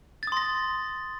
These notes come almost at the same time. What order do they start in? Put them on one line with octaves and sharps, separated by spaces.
A6 D#6 C6 A#6